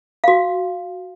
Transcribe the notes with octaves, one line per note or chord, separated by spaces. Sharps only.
F#4 F5